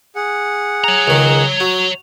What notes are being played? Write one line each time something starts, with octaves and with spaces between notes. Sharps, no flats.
G#4 F#5
C#5 A#5
C#2 D#3
F#4